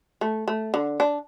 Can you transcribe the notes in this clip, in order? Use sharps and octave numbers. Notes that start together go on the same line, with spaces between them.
A3
A3
D3
D4